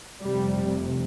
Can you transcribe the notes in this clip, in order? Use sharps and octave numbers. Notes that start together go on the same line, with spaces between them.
F1 F2 C3 G3